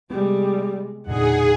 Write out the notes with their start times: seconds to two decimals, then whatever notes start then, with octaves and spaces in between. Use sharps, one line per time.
0.10 C3 G3 G#3 B3
1.07 E1 E2 A#2 D3 D#4 G#4 F#5